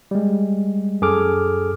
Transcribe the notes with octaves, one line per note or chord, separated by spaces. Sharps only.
G3 G#3
F#2 G#4 A4 D6 F6